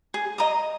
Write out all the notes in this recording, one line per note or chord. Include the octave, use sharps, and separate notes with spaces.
G#4
D#5 A#5 D#6